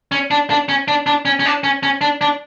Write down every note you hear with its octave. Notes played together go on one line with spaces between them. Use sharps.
C#4
D4
D4
C#4
D4
D4
C#4
C#4
D4
C#4
C#4
D4
D4